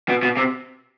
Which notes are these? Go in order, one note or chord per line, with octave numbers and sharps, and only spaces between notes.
B2
B2
C3